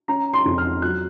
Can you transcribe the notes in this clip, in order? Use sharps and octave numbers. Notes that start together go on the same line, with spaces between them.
C#4 A#5
C6
F2
F6
F#3 F#6